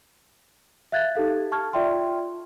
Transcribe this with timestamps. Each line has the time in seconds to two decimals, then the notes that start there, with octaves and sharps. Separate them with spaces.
0.92 E5 F5 F#6 G#6 A6
1.15 D#4 G4 A4 F5
1.52 A5 C#6 F6 G#6
1.73 F4 D5 E5 G5 C6